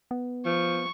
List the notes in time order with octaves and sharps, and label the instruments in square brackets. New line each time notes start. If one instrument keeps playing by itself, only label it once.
[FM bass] B3
[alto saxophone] F3 [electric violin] C#6